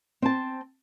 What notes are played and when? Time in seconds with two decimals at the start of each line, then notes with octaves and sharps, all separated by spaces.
0.22 C4 A5